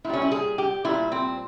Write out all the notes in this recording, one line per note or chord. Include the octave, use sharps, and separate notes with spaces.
A#2 E4
G3 C#4
E4
G#4
G4
A#2 G3 E4
C4